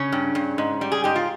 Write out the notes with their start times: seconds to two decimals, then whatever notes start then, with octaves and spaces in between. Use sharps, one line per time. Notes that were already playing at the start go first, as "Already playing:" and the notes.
Already playing: C#3 C#4
0.12 G2
0.35 G2
0.58 G#2
0.81 G3
0.92 G#4
1.04 G#2 G4
1.16 F4